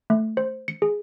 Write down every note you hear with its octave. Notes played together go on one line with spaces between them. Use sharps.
A3
C5
C#7
G#4